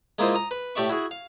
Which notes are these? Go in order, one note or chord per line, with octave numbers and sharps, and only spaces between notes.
G#3 A#3 E4 F4 C5 D#5
A#5 D#6
B4
A2 G4 D5 E5 C#6
E4 F#4 G#4
F5